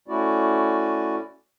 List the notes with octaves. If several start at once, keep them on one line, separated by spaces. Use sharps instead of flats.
A3 C#4 E4 F#4 D5